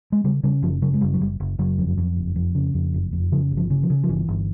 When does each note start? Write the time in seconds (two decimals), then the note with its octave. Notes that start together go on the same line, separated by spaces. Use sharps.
0.12 G#3
0.24 C#3 G3
0.43 C#3 G3
0.62 F#1 F3
0.82 C#3 F#3
0.94 G#3
1.01 F#1 G3
1.14 F#3
1.21 F#1 G3
1.40 F#1
1.59 F#1 F#3
1.78 F2
1.97 F2
2.17 F#1
2.36 F2
2.55 C#3
2.74 F2
2.94 F#1
3.13 F2
3.32 C#3 F3
3.51 G1
3.57 F3
3.70 C#3
3.83 F3
3.90 C#3
4.04 F3
4.09 G1 E3
4.28 G1